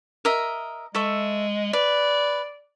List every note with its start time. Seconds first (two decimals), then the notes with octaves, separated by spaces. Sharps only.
0.25 A#4 D#5 E5
0.95 G#3 A4 E5 C#6
1.73 B4 D5